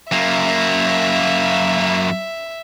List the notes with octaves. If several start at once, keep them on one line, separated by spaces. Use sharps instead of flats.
F#2 A#3 E5